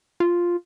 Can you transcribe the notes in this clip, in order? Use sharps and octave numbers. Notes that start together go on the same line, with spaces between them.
F4